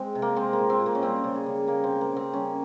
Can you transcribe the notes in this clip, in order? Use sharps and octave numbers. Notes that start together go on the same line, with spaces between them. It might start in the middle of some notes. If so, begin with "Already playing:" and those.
Already playing: G#3 C4
C3
A#3
G#3 C4
A#3
A#2
C4
A#2
A#3
C#4
G3 C4
C#3
G#4
C#3
C#3 A#3
C4
G#3
A#3
C#3 C4
G3 C#4